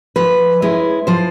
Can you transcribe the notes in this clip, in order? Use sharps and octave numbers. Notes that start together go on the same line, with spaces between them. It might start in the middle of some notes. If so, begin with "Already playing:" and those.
F3 B4
G#3 C#4 E4
F3 C5